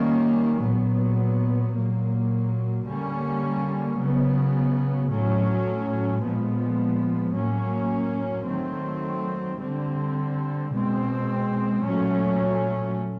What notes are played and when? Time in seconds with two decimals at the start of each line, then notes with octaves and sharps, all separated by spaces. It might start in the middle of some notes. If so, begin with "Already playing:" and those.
Already playing: D#3 G3 A#3 C#4
0.61 A#2 F#3 B3
1.74 A#2 F#3 A#3
2.86 D3 G3 A#3 C#4
3.98 C#3 F#3 B3
5.11 A2 F#3 A3 C#4
6.23 A#2 F3 G#3 B3
7.35 A2 F#3 A#3 C#4
8.47 D#3 F#3 A3 C4
9.60 D3 G3 C4
10.73 B2 G#3 C4
11.85 A#2 F#3 A3 C#4